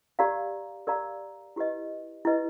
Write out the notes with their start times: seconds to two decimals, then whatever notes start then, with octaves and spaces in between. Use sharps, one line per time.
0.19 G4 A#4 D5 F5 A#5
0.87 G4 A#4 D5 F5 A#5
1.56 E4 G4 B4 D#5
2.25 E4 G4 B4 D#5